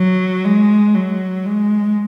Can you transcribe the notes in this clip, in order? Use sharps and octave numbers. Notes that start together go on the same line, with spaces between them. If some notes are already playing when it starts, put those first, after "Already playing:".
Already playing: F#3
G#3
F#3
G#3